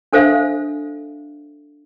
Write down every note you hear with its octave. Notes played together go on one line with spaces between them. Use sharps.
D4 A4 C5 E5 F5